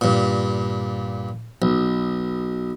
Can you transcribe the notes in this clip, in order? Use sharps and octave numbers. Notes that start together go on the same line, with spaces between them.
G2 A#2
B1